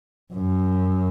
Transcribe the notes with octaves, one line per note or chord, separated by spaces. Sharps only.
F#2